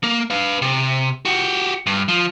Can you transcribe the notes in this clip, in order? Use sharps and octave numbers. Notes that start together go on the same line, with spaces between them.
A#3
B4 F5
C3
F#4 G4
G2
F3